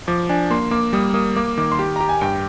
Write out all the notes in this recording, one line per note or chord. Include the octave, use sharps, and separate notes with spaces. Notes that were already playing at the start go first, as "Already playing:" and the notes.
F3 D6
D4 G#5
A#3 C6
A#3 D6
G3 D#6
A#3 D#6
A#3 D6
D#3 D6
C6
G4 D6
G4 A#5
G#5
G2 G5